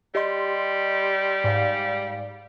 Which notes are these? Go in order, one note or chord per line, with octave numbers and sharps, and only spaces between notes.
G3 G4 D#5 C6
G#2 D5 F5